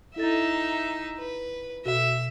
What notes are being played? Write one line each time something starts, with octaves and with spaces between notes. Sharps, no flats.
D#4 E4 A4 E5 A6
B4
B2 F#4 A4 E5